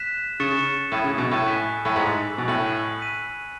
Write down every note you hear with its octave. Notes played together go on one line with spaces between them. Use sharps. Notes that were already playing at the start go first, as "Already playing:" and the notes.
Already playing: F#6 B6 E7
C#3 C#6 F#6 A6 C#7 E7
A2 B5 D#6 G#6
C#3
B2
A2
G#5 C#6 F#6 B6
A2
G#2 E6 B6 F#7
B2
A2 F#6 C#7 F#7
F#6 B6 D#7